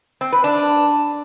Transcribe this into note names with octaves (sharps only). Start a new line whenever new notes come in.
C4
B4
D4